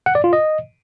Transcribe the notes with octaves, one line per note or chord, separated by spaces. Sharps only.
F#5
D5
F4
D#5